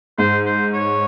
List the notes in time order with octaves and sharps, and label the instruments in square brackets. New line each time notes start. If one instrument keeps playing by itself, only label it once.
[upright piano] G#2 [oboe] C5
[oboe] C5
C#5